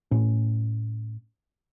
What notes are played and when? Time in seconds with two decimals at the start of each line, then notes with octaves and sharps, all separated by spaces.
0.11 A2 C#4